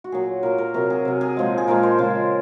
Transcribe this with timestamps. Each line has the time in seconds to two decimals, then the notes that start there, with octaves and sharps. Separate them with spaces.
0.04 F#4
0.12 A#2 F#3 G#4
0.43 A#2 F#3 A#4
0.58 A#4
0.74 C3 F#3 A#4
0.90 G#4
1.05 C3 F#3
1.21 G#4
1.37 A#2 F3 G#3
1.58 G#4
1.67 A#2 F3 G#3 A#4
1.83 C5
1.98 C#3 F3 G#3